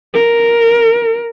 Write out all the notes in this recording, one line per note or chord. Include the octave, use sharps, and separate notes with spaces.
A#4